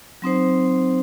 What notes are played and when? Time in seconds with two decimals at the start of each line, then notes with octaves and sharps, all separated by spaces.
0.22 F#3 C4 D#4 C5